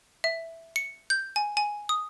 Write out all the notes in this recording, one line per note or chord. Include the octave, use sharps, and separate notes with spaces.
E5
C#7
G6
G#5
G#5
D#6